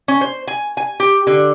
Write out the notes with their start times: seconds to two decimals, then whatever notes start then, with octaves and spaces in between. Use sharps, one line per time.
0.08 C#4
0.21 C5
0.47 G#5
0.77 G#5
1.00 G4
1.27 D3